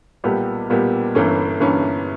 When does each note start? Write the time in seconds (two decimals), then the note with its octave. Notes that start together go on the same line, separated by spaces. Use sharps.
0.24 B1 A#2 G3 B3 G4
0.69 B1 A#2 G3 B3 G4
1.15 G1 G2 E3 A#3 C#4
1.60 G1 G2 E3 A#3 C#4